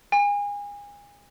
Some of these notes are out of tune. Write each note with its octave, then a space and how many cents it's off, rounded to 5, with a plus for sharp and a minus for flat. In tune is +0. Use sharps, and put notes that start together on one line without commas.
G#5 -30